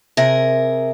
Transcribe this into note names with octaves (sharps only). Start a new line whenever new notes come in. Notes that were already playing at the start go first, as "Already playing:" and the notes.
C3 G#4 A#4